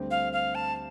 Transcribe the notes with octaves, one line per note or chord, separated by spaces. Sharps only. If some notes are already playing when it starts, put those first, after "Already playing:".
Already playing: D2 D3 G3 C4 G4
F5
F5
A5